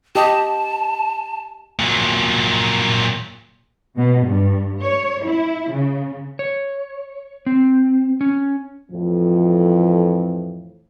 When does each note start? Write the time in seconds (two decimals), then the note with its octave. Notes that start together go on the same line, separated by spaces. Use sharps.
0.15 G4 D#5 A5
1.79 A#2 F#3
3.97 B2
4.26 G2
4.83 C#5
5.26 E4
5.71 C#3
6.39 C#5
7.46 C4
8.21 C#4
8.92 F2 A2 E3 F3